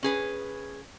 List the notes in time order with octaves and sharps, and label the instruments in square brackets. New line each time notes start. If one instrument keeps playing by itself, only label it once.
[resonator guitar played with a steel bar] C#4 G#4 B4